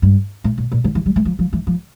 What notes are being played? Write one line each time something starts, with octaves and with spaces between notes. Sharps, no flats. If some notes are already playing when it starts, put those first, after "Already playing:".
G2
A2
A#2
A#2
D3
E3
G3
A3
F3
F3
E3
F3